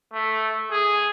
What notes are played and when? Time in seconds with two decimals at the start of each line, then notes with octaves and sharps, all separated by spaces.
0.13 A3
0.71 G#4